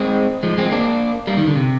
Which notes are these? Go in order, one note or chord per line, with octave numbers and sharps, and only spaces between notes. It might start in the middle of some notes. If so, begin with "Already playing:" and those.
Already playing: G#3 C4
F3 G#3
G#3 C4
A#3 D4
G3 A#3
D#3
D3
C3